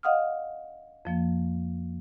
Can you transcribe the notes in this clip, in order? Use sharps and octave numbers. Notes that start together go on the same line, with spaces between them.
D#5 F5 F#5 D#6 F6
F2 F3 A#3